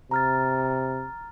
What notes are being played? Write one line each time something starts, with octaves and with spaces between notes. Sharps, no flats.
C3 A#5 F6 A6